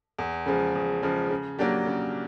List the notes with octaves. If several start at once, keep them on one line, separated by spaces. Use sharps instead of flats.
E2
C#3 F3 G#3
E2
C#3 F3 G#3
C#3
F#3 A#3 D4 G4
C#3